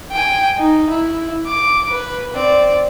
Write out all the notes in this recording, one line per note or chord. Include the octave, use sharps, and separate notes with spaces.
G5 G#5
D#4
E4
D6
B4
C4 D5